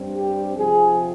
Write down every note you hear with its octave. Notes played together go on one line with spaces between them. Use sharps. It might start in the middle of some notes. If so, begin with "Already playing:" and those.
Already playing: G2 G3 C4
G4
C3 F3 C4 G#4